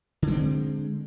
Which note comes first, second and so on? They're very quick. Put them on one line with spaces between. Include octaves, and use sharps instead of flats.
D3 G#3 C4